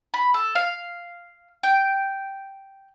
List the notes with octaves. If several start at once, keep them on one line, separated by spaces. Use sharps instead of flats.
B5
A4
F5
G5